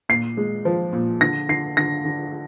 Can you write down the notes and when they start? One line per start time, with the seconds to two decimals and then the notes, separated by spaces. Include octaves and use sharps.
0.09 A#2 C7
0.37 G#3
0.65 F3
0.93 A#2
1.21 D3 A#6
1.49 D3 C7
1.77 D3 A#6
2.05 D3